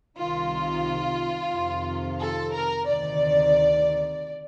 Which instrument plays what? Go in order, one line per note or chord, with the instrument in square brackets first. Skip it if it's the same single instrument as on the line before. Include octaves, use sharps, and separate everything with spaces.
[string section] C2 C3 D#3 F4
F2 C3 D#3
A4
A#4
D2 C3 D#3 D5